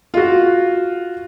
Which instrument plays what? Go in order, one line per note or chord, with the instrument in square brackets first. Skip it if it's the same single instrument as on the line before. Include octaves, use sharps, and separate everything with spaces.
[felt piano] F4 F#4